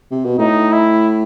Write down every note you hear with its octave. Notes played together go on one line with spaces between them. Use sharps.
C3
B2
A2 D#4
E4